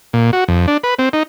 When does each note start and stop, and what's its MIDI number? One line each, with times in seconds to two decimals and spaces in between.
0.13 0.31 46
0.33 0.44 66
0.48 0.67 41
0.68 0.77 62
0.84 0.94 71
0.99 1.09 60
1.13 1.23 63